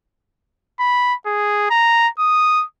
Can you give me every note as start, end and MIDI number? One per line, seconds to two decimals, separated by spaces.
0.80 1.14 83
1.26 1.66 68
1.70 2.08 82
2.19 2.65 87